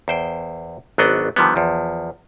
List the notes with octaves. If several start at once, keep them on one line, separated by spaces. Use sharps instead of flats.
E2 C5 G5
G#1 F#3 B3 D4 D#5 F#5
D3 D#3 F3 G3 B3
E2 F3